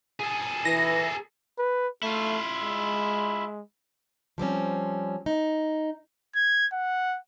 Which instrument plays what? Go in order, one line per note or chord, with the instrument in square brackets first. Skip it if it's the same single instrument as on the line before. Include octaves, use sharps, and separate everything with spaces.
[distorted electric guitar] G#4 A4
[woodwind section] E3 [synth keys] A#6
[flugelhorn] B4
[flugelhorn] A3 [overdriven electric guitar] E4 F4
[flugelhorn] G#3
[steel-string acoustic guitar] F3 G3 C4 C#4
D#4
[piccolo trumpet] G#6
F#5